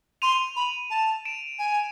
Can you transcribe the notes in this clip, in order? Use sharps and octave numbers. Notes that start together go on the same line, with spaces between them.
C6 D#7 F7
B5
A5
D7 E7
G#5